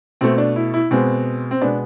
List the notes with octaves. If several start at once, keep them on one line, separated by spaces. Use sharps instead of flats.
B2 A3 C4
D4
E4
E4
B2 G#3 B3 C4
C4
B2 G#3 B3 D4